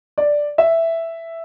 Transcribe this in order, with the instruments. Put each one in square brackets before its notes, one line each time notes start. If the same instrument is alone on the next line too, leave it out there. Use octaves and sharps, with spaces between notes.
[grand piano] D5
E5